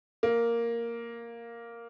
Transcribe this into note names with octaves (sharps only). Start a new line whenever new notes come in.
A#3